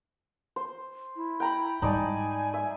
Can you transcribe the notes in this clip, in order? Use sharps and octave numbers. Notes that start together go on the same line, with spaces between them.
C5
E4
G5 A#5 B5
G#2 G3 D#4 D5 G#5 A5
E5